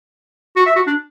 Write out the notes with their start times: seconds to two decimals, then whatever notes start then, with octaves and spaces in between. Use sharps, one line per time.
0.56 F#4
0.66 E5
0.76 F#4
0.87 D4